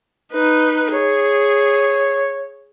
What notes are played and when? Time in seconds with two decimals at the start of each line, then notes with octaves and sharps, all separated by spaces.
0.32 D#4 B4
0.93 G#4 C#5